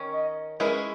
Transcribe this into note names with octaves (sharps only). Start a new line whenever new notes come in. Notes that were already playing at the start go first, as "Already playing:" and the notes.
Already playing: D#3 C#4
D#5
G#3 C#4 E4 G#4 A#4 B4